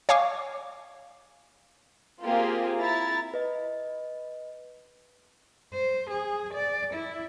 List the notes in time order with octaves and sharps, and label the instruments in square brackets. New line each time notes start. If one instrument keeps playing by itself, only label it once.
[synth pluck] C#5 F5 G#5 C#6 D6
[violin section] A#3 C4 F4 G4 G#4
E4 A#5 A6
[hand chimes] B4 D#5
[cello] C5
G#4
D5
E4